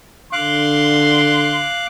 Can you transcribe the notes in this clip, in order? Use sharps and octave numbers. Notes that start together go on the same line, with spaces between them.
D3 F5 C6 D6 F#6